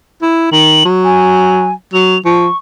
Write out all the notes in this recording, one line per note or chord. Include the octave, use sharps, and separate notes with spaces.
E4
D#3 F#7
F#3
G#5
F#3 F7
F3 C#6